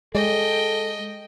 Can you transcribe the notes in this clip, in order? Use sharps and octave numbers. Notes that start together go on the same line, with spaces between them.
G#3 A4 D#5 G5